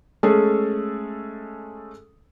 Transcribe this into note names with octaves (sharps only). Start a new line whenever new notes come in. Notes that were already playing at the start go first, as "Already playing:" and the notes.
G#3 A3 C#4 G#4 A4